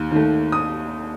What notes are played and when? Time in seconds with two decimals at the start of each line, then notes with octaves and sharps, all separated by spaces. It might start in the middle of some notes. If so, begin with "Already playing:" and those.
Already playing: D#2
0.11 D#3 A3
0.52 D#6